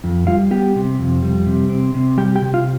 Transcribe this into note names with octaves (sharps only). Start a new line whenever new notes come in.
F2
G3 F4 F5
B3 G4 G5
C3
F2
G3
C3
C4
C3
G3 G4 G5
G4 G5
C3
F4 F5